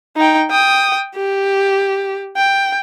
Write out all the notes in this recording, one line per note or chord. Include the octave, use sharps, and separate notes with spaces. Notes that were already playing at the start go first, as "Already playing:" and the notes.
D#4 G5
G5 D#6
G4
G5